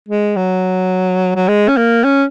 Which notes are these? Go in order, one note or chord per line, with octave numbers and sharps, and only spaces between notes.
G#3
F#3
F#3
G#3
C#4
A#3
C#4